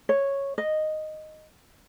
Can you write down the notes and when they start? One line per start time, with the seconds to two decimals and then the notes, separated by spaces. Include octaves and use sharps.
0.09 C#5
0.58 D#5